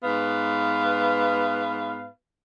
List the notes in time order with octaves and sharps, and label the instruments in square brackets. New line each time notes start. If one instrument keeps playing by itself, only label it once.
[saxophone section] G#2 B3 B4 F5